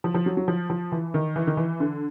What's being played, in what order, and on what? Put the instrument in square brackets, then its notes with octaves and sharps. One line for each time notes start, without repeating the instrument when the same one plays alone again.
[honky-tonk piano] F3
F3
F#3
F#3
F3
F3
E3
D#3
E3
D#3
E3
D3